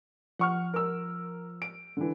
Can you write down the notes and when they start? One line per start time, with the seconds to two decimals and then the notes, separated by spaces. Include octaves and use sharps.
0.39 F3 F#5 C#6 F6
0.74 A#4 E6
1.62 D7
1.97 D3 E3